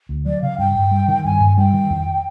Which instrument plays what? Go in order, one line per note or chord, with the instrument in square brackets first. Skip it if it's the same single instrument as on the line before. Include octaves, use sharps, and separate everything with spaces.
[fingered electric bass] D2
[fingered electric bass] F#3 [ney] D5
[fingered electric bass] C#3 [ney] F5
[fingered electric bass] G2 [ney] G5
[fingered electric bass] G2
G3
D#3
[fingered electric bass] G2 [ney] G#5
[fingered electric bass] G2
[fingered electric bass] G3 [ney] G5
[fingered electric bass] D#3
F2